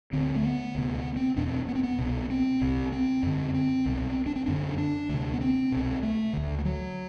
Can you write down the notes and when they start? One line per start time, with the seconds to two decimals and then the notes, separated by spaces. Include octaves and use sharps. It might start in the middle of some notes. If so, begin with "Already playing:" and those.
0.13 D2 D3 C4
0.36 A3
0.43 B3
0.75 D2 C3
1.16 C4
1.37 E2 B2 D4
1.47 C4
1.68 B3
1.75 C4
1.83 B3
1.99 C2 B2
2.30 C4
2.61 C2 C3
2.92 C4
3.23 F#2 D3
3.54 C4
3.86 C2 B2
4.26 D4
4.36 C4
4.46 F#2 D3 D4
4.78 D4
5.09 D2 C3
5.33 B3
5.41 C4
5.72 C2 B2
6.03 A3
6.33 D2 D3
6.65 F#3